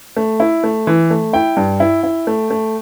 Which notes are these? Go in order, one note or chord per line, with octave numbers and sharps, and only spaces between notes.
A3
E4
A3
E3
A3
E4 G5
G2
E4
E4
A3
A3